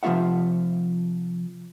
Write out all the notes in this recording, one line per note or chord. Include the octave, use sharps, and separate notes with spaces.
C3 F3 F#3 F4 E5 F#5